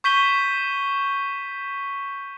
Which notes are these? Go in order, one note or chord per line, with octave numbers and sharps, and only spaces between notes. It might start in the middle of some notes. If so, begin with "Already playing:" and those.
C#6 G6 B6 D#7 G7